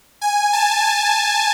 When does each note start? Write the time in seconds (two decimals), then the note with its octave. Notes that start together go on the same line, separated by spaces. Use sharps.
0.22 G#5
0.53 A5
0.84 A5